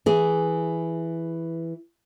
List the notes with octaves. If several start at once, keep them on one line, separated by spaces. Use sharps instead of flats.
E3 G#4